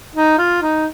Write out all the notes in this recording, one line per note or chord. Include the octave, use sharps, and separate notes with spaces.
D#4
F4
D#4